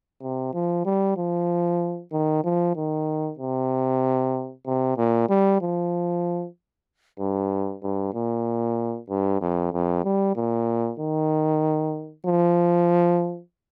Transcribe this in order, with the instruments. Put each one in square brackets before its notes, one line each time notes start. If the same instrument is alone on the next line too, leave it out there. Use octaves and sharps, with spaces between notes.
[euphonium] C3
F3
G3
F3
D#3
F3
D#3
C3
C3
A#2
G3
F3
G2
G2
A#2
G2
F2
F2
G3
A#2
D#3
F3